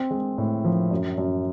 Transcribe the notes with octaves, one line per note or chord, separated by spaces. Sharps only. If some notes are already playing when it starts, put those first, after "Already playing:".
Already playing: C4
G#3
A2
F3
F#2
F#2